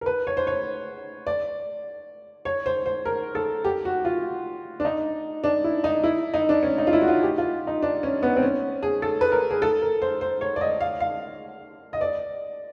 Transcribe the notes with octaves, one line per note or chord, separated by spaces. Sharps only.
A#4
B4
C#5
C5
C#5
D5
C#5
C5
C5
A#4
A4
G4
F#4
F4
D4
D#4
D4
E4
D#4
E4
D#4
D4
C#4
D#4
F4
E4
F#4
F4
G4
F4
D#4
D4
C#4
B3
C4
C#4
G#4
A4
B4
A#4
G#4
A4
A#4
C5
C5
C#5
D5
D#5
F5
F5
D#5
D5